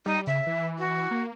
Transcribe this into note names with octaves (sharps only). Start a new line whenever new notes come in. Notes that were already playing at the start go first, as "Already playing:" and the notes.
G3 D#4
C#3 E5
E3
F#4
A#3